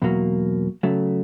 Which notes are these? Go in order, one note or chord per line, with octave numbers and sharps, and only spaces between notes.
E2 B2 F#3 A#3
C#3 F#3 A3